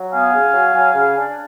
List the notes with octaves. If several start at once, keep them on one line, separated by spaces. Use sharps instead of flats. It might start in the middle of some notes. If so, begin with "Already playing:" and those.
Already playing: F#3
B3 F5 G#5
C#3
F#3
F#3
C#3
D4